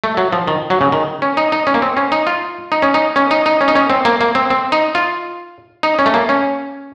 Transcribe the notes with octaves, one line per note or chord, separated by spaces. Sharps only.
A3
F#3
F3
D#3
F#3
C#3
D#3
C#4
D#4
D#4
C#4
A#3
C4
C#4
D#4
F4
D#4
C#4
D#4
C#4
D#4
D#4
C#4
D#4
C#4
C4
A#3
A#3
C4
C4
D#4
F4
D#4
C#4
A3
A#3
C#4